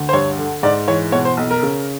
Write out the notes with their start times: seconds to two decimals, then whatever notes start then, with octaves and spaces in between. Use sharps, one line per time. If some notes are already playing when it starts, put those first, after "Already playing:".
Already playing: D2 D3
0.09 C5
0.13 G2 C#5
0.38 D3
0.63 G#2 D5
0.87 E3 C#5
1.12 B2 C#5
1.25 C5
1.37 B1
1.51 A#4
1.63 C#3